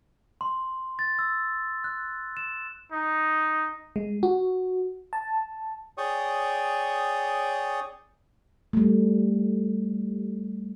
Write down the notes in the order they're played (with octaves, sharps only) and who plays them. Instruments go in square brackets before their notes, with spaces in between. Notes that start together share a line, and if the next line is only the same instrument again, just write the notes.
[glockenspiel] C6
A6
E6
F#6
E7
[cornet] D#4
[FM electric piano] G#3
F#4
A5
[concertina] G#4 C#5 D5 G5 C#6 D#6
[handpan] G3 A3